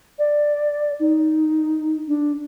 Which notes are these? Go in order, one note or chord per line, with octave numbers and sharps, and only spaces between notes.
D5
D#4
D4